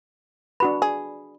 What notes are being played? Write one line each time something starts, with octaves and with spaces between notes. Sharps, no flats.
D4 F#4 B4 B5
G#4